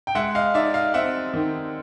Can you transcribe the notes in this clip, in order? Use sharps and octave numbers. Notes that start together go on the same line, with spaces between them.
G5
G#3 E5 F#5
D#5 F5
D#4 D5 E5
D#5 F5
C4 E5 F#5
D#3